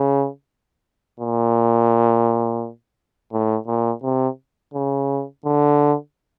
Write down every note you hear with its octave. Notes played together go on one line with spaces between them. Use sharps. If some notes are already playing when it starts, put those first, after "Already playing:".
Already playing: C#3
A#2
A2
A#2
C3
C#3
D3